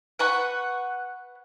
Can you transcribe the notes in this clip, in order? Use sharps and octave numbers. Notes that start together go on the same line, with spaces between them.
B4 F#5 C#6